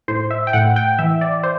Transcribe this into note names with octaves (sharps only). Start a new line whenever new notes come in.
A2 C5
E5
G5
A2 F#5
G5
E3 E5
D5
C5